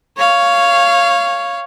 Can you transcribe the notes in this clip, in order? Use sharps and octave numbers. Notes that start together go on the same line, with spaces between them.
C#5 F5